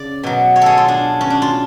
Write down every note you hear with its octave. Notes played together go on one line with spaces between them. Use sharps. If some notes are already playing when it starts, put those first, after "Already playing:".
Already playing: C#3 D5
B2 F#3
C#5
G#4 A4
F4
D4
C#4
D4
F4